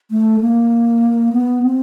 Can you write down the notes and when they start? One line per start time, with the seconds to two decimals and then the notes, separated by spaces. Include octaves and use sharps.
0.11 A3
0.41 A#3
1.33 B3
1.63 C4